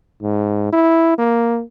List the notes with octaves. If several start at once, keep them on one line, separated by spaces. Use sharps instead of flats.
G#2
E4
A#3